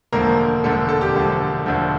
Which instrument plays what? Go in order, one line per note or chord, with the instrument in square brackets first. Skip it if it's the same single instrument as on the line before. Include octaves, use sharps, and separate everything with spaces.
[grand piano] E1 D2 D3 F3 A#3 A#4
E1 D2 D3 F3 A4
A4
G4
E1 D2 D3 F3
E1 D2 D3 F3